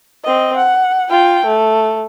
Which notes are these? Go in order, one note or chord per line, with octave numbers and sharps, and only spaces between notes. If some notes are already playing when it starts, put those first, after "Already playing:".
C4 D#5
F#5
F4 G5
A3